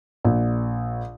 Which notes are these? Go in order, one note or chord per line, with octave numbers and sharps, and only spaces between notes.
A#1